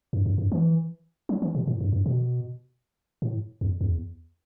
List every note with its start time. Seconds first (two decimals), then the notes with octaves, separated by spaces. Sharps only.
0.13 F#2
0.26 F#2
0.38 F#2
0.52 E3
1.29 F#3
1.42 E3
1.55 B2
1.67 A2
1.81 F#2
1.92 F#2
2.06 B2
3.22 A2
3.61 E2
3.81 E2